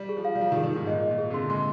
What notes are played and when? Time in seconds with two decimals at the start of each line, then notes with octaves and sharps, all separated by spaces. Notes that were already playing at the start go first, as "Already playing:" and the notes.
Already playing: G3
0.09 G#4
0.17 F3
0.25 F5
0.35 G3
0.40 F3 F4
0.52 D#3
0.56 G#4
0.64 D#3
0.72 G#2 G#4
0.87 A#2 D#5
1.03 D#5
1.11 A#2
1.18 G#4
1.30 C3
1.34 D3 C6
1.50 G#3 C6